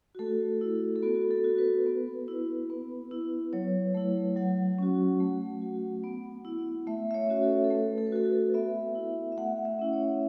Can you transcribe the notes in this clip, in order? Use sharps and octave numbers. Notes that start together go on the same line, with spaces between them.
F#4
A3 A4
E4
A4
B3 F#4
F#4
A4
F#4
B4
B3
E4
B3
E4
F#3 C#5
A3 E4
F#3 F#5
C#4 F#4
A3
F#4
B3
E4
A3 E5
E5
C#5
C#4 F#4
A4
A4
A3 B4
A4
B4
F#4 A4
A4
B3 E5
E4
E5
A3 F#5
E5
C#4 E4
C#5